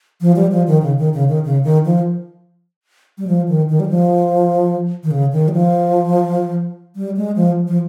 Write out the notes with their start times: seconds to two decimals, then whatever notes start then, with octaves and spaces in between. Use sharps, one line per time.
0.21 F3
0.36 G3
0.52 F3
0.67 D#3
0.82 C#3
0.98 D#3
1.14 C#3
1.28 D#3
1.44 C#3
1.64 D#3
1.85 F3
3.18 G3
3.27 F3
3.48 D#3
3.69 D#3
3.80 G3
3.89 F3
5.03 D#3
5.11 C#3
5.32 D#3
5.48 G3
5.52 F3
6.96 G3
7.17 G#3
7.36 F3
7.68 F3